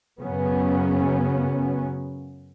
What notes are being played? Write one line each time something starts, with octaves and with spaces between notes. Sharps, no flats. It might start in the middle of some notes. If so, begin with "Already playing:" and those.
F#2 C#3 F#3 B3 C#4